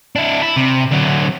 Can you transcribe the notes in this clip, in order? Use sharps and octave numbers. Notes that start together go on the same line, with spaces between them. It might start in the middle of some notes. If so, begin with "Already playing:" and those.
D4 E4
E4
C3
D3 F#3